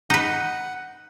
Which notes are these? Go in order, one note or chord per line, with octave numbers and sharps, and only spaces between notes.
D#4 B4 F#5